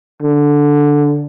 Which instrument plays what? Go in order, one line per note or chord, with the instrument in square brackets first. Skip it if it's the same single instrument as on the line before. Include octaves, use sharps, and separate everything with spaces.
[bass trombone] D3